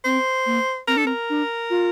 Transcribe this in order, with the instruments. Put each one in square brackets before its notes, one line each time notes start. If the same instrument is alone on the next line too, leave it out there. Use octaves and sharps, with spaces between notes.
[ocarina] C4 [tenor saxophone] C5
[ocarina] A#3
[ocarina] C4 [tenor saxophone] A#4
[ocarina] D4 [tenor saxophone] A4
[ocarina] C4 [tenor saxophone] A#4
[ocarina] D4
F4